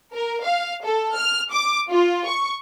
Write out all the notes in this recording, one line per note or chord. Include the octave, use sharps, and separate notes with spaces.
A#4
F5
A4
F6
D6
F4
C#6